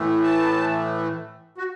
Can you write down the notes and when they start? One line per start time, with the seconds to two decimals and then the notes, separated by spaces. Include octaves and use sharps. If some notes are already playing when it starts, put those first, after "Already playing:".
Already playing: A2 E3 A3
0.24 A5
1.58 F#4